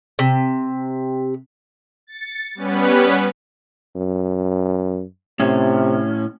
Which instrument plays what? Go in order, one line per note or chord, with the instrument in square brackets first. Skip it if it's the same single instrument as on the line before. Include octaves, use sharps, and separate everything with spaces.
[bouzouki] C3
[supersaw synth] A6 C#7
G3 B3 C#4 B4
[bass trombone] F#2
[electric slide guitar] A2 C#4 [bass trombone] C3